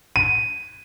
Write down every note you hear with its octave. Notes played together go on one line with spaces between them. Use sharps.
D#7